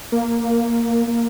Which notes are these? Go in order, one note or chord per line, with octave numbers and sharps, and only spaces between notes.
A#3
A#3